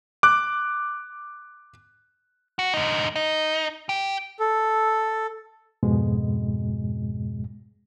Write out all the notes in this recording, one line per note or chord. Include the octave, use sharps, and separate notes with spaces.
D6 F#6
F#4
D3 D#4
D#4
G4
A4
F2 G#2 B2 G#3